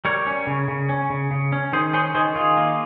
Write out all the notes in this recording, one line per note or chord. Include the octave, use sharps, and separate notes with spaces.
G3 A#4 C#5
C#4
C#3
C#3
C#4
C#3
C#3
C#4
D#3 G#4 C5
C#4 G#4 C5
D#3 G#4 C5
D#3 F4 G#4
A#3